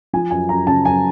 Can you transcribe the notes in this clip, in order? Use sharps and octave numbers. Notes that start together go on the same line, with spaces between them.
F3 G#5
F#2 G#5
F#2 A#5
C#3 A5
F#2 G#5